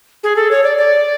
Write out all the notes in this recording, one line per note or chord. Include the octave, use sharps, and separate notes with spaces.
G#4
A4
C#5
D5
D5